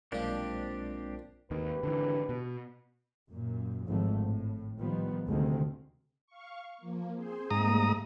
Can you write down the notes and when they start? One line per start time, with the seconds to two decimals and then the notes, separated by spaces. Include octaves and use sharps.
0.12 B1 A#2 F3 G#3 C4 D4 G4 D5
1.51 G#1 D#2 D#3 G4 B4
1.83 D3 E3
2.29 B2
3.30 F#2 A#2
3.88 G#1 G#2 F3 A3
4.21 A2
4.79 D#3 F3 G3 B3
5.27 D2 C3 D#3 G#3 C4
6.27 F5 C#6
6.78 F3 A#3
7.14 C4 G#4 C5
7.50 G#2 G3 A3 A#3 A#5 D#6